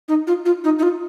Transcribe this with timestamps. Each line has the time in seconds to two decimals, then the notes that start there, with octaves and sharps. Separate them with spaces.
0.08 D#4
0.27 F4
0.45 F4
0.64 D#4
0.79 D#4
0.83 F4